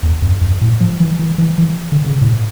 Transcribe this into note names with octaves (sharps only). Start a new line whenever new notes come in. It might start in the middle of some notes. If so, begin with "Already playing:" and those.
E2
F2
F2
A2
F3
E3
E3
E3
E3
D3
C#3
A2